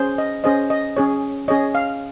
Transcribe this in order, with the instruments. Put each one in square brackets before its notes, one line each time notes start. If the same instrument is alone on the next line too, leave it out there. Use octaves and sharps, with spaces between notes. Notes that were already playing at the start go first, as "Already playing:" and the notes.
Already playing: [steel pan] C#4 G#4 C5
D#5
C#4 G#4 C5 D#5
D#5
C#4 G#4 C#5
C#4 G#4 C#5 D#5
F5